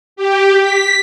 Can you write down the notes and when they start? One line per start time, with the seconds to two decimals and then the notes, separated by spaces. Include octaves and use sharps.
0.16 G4
0.60 B6